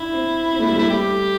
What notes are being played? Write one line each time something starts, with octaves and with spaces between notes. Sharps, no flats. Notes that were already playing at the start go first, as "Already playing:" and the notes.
Already playing: D4 E4
C4
C4
A3
G3
A3 E4
A3 G4